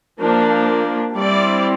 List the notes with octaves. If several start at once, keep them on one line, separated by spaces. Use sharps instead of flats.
F3 A#3 D4
G3 C4 E4 D5